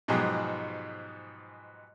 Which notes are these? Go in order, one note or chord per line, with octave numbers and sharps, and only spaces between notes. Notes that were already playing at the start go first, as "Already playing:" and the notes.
G#2 B2 F3 F#3 G4 G#4